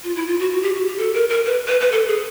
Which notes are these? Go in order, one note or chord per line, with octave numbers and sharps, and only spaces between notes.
F4
E4
F4
F#4
F#4
G4
F#4
G4
A4
A#4
A#4
B4
B4
B4
A4
G#4